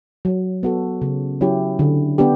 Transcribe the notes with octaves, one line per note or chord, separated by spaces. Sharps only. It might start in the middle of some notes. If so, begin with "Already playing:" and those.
F#3
B3 F#4 A4
C#3
F#3 C#4 E4 G4
D3
B3 D4 G4